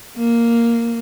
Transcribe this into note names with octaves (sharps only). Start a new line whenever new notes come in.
A#3